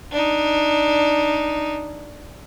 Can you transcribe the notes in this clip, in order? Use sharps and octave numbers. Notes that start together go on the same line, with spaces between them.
D4 D#4